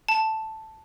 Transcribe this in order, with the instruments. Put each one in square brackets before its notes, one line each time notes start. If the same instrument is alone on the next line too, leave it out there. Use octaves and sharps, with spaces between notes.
[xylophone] A5